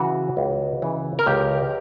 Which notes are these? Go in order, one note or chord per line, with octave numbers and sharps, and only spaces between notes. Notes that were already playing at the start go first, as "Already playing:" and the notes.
Already playing: C#3 E3 F#4
C#2
C#3 E3
A#4
C#2 G4